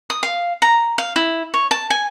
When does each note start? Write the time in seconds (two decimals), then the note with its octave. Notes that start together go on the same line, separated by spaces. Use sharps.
0.10 D#6
0.23 F5
0.62 A#5
0.98 F5
1.16 E4
1.54 C#5
1.71 A5
1.90 G#5